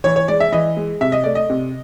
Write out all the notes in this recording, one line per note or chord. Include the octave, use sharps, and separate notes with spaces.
E3 C#5
C#5
G#3 D5
E5
E3 D#5
G#3
C3 E5
D#5
A3 D5
D#5
C3